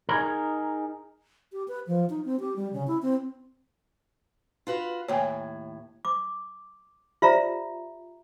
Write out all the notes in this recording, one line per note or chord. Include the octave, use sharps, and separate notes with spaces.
D#4 G#4 A#4
G4
B4
F3
D#4
C4
G4
G3
C#3
E4
C4
F4 F#4 B4
D#2 A2 C#5 G5 G#5
D6
F4 G4 C5 D5 E5 A#5